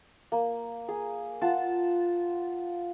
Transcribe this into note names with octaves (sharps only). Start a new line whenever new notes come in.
A#3
G#4
F4 F#5 A5